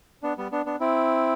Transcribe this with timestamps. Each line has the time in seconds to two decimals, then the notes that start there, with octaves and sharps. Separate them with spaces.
0.23 B3 D4
0.38 G3 B3
0.52 B3 D4
0.66 B3 D4
0.80 C4 E4